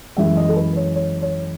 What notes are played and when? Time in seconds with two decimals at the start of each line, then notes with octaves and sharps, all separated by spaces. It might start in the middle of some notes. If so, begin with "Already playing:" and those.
0.17 F#2 E3 G#3 E5
0.37 D#5
0.49 A4
0.56 B4
0.76 C#5
0.95 C#5
1.22 C#5